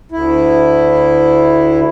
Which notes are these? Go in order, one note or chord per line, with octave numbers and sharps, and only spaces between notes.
D2 E4